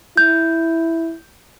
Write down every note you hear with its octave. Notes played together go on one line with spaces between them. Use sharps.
E4 G6